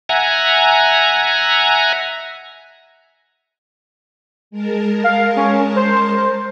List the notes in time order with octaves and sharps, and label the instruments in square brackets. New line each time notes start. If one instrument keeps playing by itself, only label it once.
[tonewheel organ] E5 F#5 G#5 A#5
[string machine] G#3 A#4 A5
[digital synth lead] F5
C#4
C5